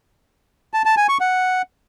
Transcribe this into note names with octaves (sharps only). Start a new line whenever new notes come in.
A5
A5
G#5
C#6
F#5